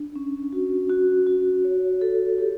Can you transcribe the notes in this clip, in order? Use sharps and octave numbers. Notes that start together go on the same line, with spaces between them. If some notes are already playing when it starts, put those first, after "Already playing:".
Already playing: D4
C#4
F#4
F#4
F#4
C#5
A4
G4